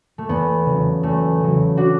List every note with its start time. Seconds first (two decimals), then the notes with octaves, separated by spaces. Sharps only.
0.18 A3
0.29 E2 B3
0.66 C#3 F#3
1.03 E2 A3
1.40 C#3 F#3
1.77 D4 F#4